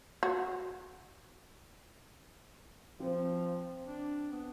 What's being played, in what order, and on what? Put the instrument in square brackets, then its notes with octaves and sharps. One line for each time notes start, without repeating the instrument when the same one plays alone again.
[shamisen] F#4
[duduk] F3 [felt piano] C4
[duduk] D4
B3